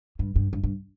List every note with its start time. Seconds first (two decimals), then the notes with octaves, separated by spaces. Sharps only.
0.19 G2
0.36 G2
0.53 G2
0.64 G2